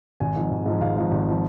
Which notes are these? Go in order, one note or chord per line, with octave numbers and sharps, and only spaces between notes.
G#1 G#5
G#2 F3
G#1
G#2 F3
G#1 F5
G#2 F3
G#1
F3